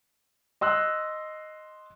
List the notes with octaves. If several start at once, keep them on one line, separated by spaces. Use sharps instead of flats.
D#5 C6 E6 F#6